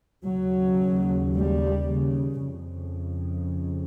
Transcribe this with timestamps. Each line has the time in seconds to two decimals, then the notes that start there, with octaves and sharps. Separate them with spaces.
0.25 D#2 C#3 F#3
1.35 G3
1.91 C#3
2.47 F2 C#3